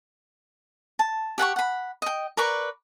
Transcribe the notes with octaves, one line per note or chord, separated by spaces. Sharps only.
A5
G4 F#5 G#5 C#6
F#5 B5
D#5 G5
A#4 B4 D5 C#6